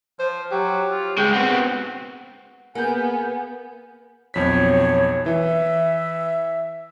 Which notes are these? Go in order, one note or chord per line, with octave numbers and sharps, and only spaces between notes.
F3 C5
F#3 G4
F4
C#3 G#3 G5
B3 C4 F#4
A#3 B3 G#4 F#5 G#5 G6
B1 F2 C#5 B6
E3 E5